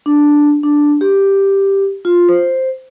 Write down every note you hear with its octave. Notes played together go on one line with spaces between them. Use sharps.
D4
D4
G4
F4
C5